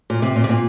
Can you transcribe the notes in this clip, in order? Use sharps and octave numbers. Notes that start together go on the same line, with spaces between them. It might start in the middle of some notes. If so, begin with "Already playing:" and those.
A#2
C3
A#2
C3
A#2